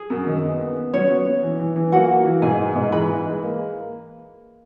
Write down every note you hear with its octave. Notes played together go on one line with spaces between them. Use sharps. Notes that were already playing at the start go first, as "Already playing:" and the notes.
Already playing: G#4
F#2
D#3
B3
B3
B3
F#3 C#4 C#5
B3
B3
E3
E3
E3
A#3 F#4 F#5
A#3
E3
G#2 G#4 G#5
G#3
G#2
E3 B4 B5
E3
G#3
A#3